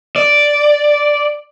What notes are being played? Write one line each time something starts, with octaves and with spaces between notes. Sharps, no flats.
D5